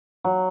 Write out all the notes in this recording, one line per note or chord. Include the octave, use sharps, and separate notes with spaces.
F#3